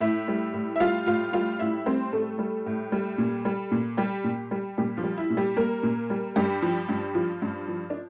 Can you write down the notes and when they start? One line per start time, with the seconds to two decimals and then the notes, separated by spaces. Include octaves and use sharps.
0.01 A2 E4 E5
0.28 G3
0.53 A2
0.76 E5
0.80 G3 F4 F5
1.06 A2 F4 F5
1.33 G3 F4 F5
1.59 A2 E4 E5
1.86 G3 C4 C5
2.12 A2 A3 A4
2.39 G3
2.66 A2
2.92 G3
3.18 A#2
3.45 G3
3.71 A#2
3.97 G3 G4
4.24 A#2
4.51 G3
4.78 A#2 G3 G4
4.97 F3 F4
5.04 G3
5.18 E4
5.30 A#2
5.37 G3 G4
5.56 G3 A#3 A#4
5.83 A#2
6.10 G3
6.36 G2 G3 G4
6.62 F3
6.89 G2
7.15 F3 F4
7.42 G2
7.68 F3
7.90 D4